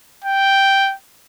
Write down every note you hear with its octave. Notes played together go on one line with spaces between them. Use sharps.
G5